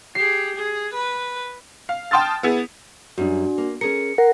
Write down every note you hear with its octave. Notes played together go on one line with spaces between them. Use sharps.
G4 G#4 C7
G#4
B4
F5
G5 A5 C6 D#6 F6 A6
B3 E4 G#4
F#2 G3 D4 F#4
A#3
C#4 G#4 A#4 C#7
A#4 F#5